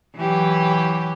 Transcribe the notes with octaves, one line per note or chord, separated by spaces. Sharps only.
E3 F#3 G4